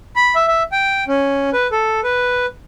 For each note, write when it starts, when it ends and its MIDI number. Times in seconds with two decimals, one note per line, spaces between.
0.16 0.35 83
0.35 0.47 76
0.48 0.63 76
0.72 1.04 79
1.08 1.50 61
1.53 1.67 71
1.72 2.00 69
2.04 2.46 71